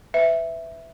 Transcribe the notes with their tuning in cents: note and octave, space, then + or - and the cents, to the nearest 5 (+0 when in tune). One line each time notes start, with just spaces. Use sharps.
B4 +30 E5 +0